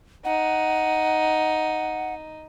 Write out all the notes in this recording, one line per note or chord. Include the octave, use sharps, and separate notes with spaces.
D#4 F#5